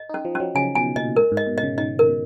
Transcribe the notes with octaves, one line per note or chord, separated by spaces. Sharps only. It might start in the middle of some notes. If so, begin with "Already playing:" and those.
Already playing: D#5
D#4
C#4
F3
C#4
F#3
C#3 G#5
B2 G#5
A#2 D#5
G#2 A#4
G#2
D#5
B2
D#5
C#3
D#3 D#5
A#4
B2